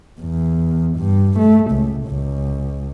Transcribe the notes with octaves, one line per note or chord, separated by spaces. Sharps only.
E2
G2
A3
C#2
C#2